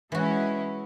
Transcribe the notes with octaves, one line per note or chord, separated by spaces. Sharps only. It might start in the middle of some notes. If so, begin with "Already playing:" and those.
E3 G#3 C#4 E4 F#4